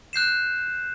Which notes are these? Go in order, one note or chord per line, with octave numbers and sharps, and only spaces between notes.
F#6 G6 C7 E7